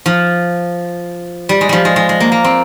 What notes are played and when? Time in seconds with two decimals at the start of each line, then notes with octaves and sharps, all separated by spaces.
0.06 F3
1.49 G3
1.61 G#3
1.69 F3 G3
1.85 G#3
1.96 G#3
2.09 G#3
2.20 A#3
2.32 A#3
2.44 C4